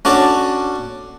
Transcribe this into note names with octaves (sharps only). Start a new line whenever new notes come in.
C#4 D4 F#4 A4